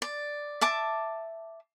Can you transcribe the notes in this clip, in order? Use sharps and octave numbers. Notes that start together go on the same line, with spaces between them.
D5
E5 A5 D6